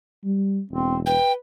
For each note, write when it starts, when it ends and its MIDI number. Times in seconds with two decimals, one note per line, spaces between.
0.24 0.61 55
0.70 1.15 28
0.70 0.96 60
1.06 1.35 71
1.06 1.32 79